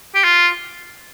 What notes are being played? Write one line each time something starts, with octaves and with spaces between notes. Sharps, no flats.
G4
F4